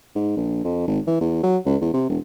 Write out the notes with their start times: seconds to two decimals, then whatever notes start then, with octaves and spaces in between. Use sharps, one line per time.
0.15 G#2
0.37 A#1
0.64 F2
0.87 G#1
1.07 E3
1.21 E2
1.44 F#3
1.66 C#2
1.81 E2
1.94 C3
2.09 E1